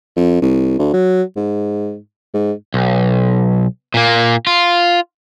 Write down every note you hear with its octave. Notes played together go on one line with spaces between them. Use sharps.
F2
C2
D2
F#3
G#2
G#2
B1
A#2 A#3
F4